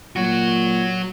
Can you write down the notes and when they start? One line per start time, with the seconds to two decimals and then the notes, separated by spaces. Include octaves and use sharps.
0.16 A#2 F#3 F#4